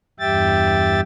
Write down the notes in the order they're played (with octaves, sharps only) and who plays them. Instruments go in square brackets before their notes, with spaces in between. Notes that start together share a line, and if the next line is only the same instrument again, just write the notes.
[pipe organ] E2 G2 G4 E5 G5 A6